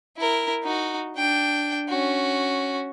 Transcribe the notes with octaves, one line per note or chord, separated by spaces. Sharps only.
E4 A#4
D#4 F#4
D4 G5
C#4 F#4